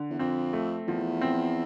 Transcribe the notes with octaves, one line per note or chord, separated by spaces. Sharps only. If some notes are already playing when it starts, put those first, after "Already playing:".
Already playing: D3
E2
F2 C4
A3
E2 F3
C4